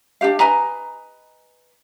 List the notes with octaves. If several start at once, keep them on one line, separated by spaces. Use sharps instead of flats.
D4 F#4 G4 F5
B4 D#5 G#5 A#5